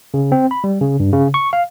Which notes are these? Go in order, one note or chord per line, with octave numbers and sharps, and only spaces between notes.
C#3
C4
B5
G3
C#3
G2
C#3
C#6
F5